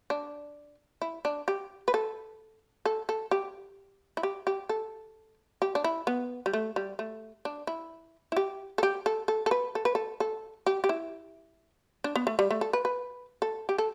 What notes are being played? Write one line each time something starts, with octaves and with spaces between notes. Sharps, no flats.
D4
E4
D4
G4
B4
A4
A4
A4
G4
E4
G4
G4
A4
G4
D4
E4
B3
G3
A3
G3
A3
D4
E4
E4
G4
A4
G4
A4
A4
A4
B4
A4
B4
A4
A4
G4
G4
E4
D4
B3
A3
G3
A3
A4
B4
B4
A4
G4
A4